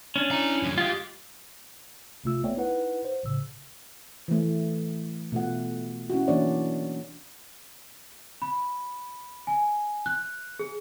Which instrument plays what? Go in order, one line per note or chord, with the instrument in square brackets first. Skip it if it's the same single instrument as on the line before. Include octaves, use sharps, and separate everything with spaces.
[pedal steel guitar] C#4 D4
[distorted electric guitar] E4 A#5
F#2 D#3
[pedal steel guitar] G#3 F4 [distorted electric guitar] G4
[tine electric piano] A#1 C3 A3 F4 E6
A1 A3 B3 C#5 D5 G5
D#4 E4 B4 F#5
C5
A#1 A2 C#3 E6
[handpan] E3 A3
B2 A3 F4 F#5
C#4 E4 F#4
E3 F#3 A#3 D4 C#5 D5
[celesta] B5
G#5
F#6
G#4